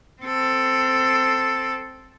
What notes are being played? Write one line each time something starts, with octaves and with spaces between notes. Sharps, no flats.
C4 A4